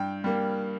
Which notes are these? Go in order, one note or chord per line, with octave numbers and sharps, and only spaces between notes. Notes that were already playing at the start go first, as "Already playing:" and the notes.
Already playing: G2 G5
G3 A#3